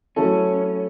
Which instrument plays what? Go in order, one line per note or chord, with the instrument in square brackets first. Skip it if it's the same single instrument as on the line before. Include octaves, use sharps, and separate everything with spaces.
[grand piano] F#3 A3 E4 A4 [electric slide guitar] C#4